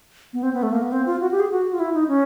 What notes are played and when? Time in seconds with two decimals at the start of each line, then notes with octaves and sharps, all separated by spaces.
0.33 B3
0.43 C4
0.53 B3
0.63 A3
0.73 A#3
0.83 B3
0.92 C4
1.06 F4
1.21 F#4
1.31 G4
1.40 G#4
1.50 F#4
1.73 F4
1.80 E4
1.94 D#4
2.08 C#4